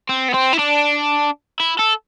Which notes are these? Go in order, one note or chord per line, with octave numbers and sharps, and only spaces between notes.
C4
B3
C4
E4
D4
E4
A4